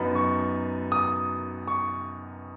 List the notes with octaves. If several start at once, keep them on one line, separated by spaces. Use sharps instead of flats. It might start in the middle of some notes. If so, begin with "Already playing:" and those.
Already playing: F#2 F#3 B3 D#4 B5
C#6
D#6
C#6